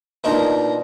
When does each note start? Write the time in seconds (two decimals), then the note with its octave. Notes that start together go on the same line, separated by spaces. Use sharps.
0.24 B2 A#3 D4 D#4 F4 A#4